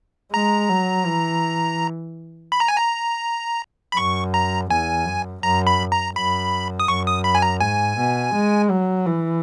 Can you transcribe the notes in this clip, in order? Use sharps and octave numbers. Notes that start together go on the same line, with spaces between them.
G#3 A#5
F#3
E3
B5
A#5
G#5
A#5
B5
F#2 C#6
A#5
E2 G#5
F#2
F#2 A#5
B5
A#5
F#2 B5
D#6
F#2 C#6
D#6
B5
G#5
A#5
G#2 G#5
B2
G#3
F#3
E3